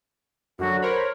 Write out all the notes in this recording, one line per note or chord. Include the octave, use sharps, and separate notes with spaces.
F#2 D3 F#3 F#4
A#4 C5 C#5 B5